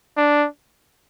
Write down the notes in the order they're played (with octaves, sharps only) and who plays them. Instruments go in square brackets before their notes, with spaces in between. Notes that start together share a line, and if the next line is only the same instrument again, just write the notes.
[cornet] D4